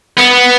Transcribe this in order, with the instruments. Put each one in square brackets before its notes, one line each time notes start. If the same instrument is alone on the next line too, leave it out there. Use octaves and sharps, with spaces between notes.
[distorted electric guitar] B3